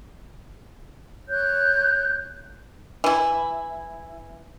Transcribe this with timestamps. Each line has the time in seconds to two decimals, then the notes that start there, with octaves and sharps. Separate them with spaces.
1.28 C#5 F#6 G6
3.04 E3 E4